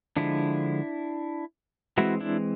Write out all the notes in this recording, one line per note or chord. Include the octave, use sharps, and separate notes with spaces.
D3 F3 G#3 D4 E4
E3 G#3 C4 E4 F#4
D4 E4